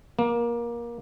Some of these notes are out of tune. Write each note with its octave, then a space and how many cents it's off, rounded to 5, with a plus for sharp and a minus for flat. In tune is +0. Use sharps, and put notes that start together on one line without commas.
A#3 +20